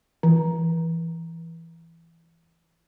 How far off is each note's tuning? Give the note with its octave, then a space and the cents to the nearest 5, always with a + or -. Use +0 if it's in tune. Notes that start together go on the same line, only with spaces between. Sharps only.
E3 +10